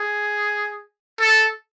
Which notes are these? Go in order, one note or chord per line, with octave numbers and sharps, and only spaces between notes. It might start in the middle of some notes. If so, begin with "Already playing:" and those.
Already playing: G#4
A4